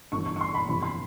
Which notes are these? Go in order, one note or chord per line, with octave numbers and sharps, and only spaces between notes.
G1 G2 E3 C#6
C#6
C#6
C6
B5
G1 F2 C3 E3 B5
C6